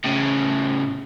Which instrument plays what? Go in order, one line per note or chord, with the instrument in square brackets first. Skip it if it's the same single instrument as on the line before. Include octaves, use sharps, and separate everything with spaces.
[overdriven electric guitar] A2 C#3